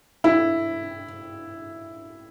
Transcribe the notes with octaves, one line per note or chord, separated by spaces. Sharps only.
E4